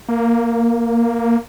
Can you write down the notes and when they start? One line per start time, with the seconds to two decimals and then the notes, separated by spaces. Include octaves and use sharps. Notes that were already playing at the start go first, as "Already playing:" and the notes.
0.09 A#3